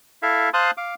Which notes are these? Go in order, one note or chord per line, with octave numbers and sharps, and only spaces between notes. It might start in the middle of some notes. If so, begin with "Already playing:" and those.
E4 A4 E5 F5
C5 F5 A5 C6 D#6 F#6
F5 D6